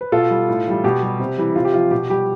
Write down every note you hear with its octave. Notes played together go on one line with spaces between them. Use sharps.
B4
B2 F4 A4
G3
A2
E3 G3
B2 G4
G3
C3
E3 G3
C3 F4
G4
F3 F4
B2 G4
G3 G4